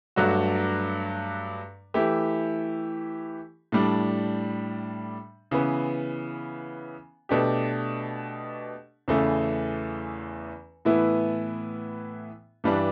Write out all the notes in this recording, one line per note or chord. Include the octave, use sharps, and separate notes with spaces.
G2 F#3 A3 D4 F#4
E3 A3 E4 G4
A2 G3 D4
C#3 E3 B3
B2 A3 D4 G4
E2 C#3 E3 A3
A2 E3 B3 E4
G2 E3 G3 D4